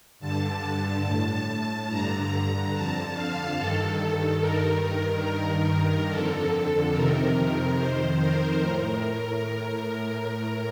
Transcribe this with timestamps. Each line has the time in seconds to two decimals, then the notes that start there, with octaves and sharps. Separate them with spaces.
0.20 G2 D3 A5
1.04 A2
1.88 G2 D3 A#5
2.72 F2 D3 A5
3.14 F5
3.56 G2 D#3 A4
4.41 G2 D#3 A#4
5.24 G2 D#3 A#4
6.08 F2 D3 A4
6.93 F2 C3 D#3 A#4
7.76 F2 D#3 C5
8.18 A#4
8.60 A2 A#4